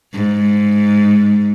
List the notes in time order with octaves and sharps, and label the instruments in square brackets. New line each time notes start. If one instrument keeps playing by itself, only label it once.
[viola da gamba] G#2